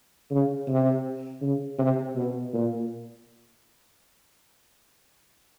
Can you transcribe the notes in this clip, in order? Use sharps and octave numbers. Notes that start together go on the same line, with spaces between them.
C#3
C3
C#3
C3
B2
A#2